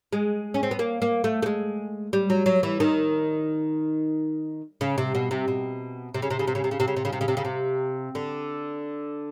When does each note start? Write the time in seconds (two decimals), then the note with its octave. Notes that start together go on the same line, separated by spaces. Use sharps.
0.13 G#3
0.54 C#4
0.63 C4
0.71 B3
0.79 A#3
1.02 A#3
1.24 A3
1.43 A3
1.46 G#3
2.13 G3
2.30 F#3
2.46 F#3
2.63 E3
2.80 D#3
4.81 C#3
4.98 C3
5.15 B2
5.31 C3
5.48 B2
6.14 C3
6.22 C#3
6.30 C3
6.39 C#3
6.48 C3
6.55 C#3
6.64 C3
6.71 C#3
6.80 C3
6.88 C#3
6.96 C3
7.05 C#3
7.13 C3
7.21 C#3
7.28 C3
7.37 C#3
7.45 C3
8.15 D3